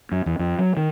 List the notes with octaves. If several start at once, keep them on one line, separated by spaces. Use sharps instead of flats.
F#2
E2
F2
F#3
D#3